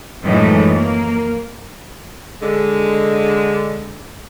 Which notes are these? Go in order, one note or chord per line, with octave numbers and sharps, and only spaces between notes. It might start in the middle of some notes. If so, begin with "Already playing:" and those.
F#2 A2 E3 F3 G#3 D#4
A#3
D3 G#3